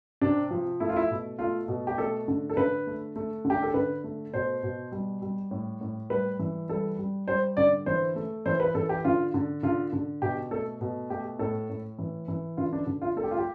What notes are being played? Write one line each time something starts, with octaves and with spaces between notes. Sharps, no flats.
C3 D4
F3
A3 E4
F4
E4
B2
A3 F4
B2
G4
A3 A4
D3
A4
D3 B4
A3
A3
D3
G4
A4
D3 B4
A3
B2 C5
B2
G3
G3
A2
A2
G3 B4
E3
G3 A4
G3
G3 C5
D3 D5
E3 C5
A3
E3 C5
B4
E3 A4
G4
D3 F4
D3
D3 F4
D3
B2 G4
A3 A4
B2
A3 G4
A2 A4
A2
E3
E3
D3 F4
D4
D3
F4
A3 A4
G4
F4
G4